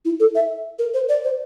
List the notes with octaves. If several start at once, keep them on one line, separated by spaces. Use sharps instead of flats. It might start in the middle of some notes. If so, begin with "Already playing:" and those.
E4
A4
E5
A#4
C5
D5
C5